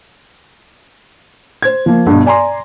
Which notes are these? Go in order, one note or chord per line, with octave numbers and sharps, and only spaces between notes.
C5 G#6
F3 A#3
G2 B2
D5 G#5 A#5 C6